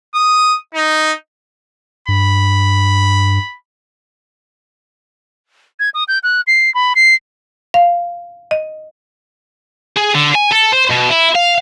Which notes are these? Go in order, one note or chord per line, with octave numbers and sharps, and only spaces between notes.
D#6
D#4
G2 B5
G#6
D#6
G6
F#6
C7
B5
C7
F5
D#5
G#4
D3
G#5
A4
C5
B2
E4
F5